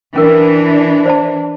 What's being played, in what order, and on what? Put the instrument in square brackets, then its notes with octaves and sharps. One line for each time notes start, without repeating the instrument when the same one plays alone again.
[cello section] E3 D4 [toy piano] C#4 A#4
[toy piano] C5 D5 A5